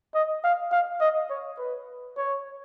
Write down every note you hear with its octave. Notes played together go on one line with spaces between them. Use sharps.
D#5
F5
F5
D#5
C#5
B4
C#5